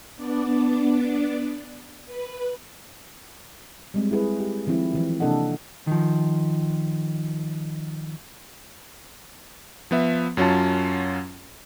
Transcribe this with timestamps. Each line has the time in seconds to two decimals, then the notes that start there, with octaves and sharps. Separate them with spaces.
0.16 B3 D4 D5
2.06 B4
3.94 G3 G#3 C4
4.11 E4 G#4 B4
4.40 G4
4.67 D#3 F3 C4 E4
4.93 D#3 E3 F#3
5.20 C3 A#3 D4 A4 D#5 F#5
5.87 D#3 F3
9.91 F3 B3 E5
10.37 F#2 F#3 C#4 F4 A5